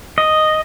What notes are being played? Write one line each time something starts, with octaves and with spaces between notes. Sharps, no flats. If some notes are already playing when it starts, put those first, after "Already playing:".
D#5